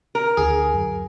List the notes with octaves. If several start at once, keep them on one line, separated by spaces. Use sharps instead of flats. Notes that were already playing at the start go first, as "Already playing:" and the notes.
A#4
D2 G#4
F#2